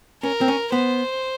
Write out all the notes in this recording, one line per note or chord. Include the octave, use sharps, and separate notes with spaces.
C#4 A#4
C4
C#4
B3 C5